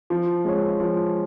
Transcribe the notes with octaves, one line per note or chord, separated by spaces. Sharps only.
F3
G#3 C#4
F3